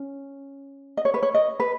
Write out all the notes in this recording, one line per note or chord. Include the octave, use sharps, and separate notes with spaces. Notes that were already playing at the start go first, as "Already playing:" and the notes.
Already playing: C#4
D#5
C#5
B4
C#5
D#5
B4